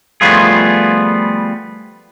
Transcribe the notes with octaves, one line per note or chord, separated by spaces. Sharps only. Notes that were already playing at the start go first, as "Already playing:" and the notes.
F3 G3 A3 B3 F4 G#4